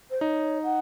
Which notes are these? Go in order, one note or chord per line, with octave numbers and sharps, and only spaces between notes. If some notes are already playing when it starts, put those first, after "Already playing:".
C5
D#4 C#5
F#5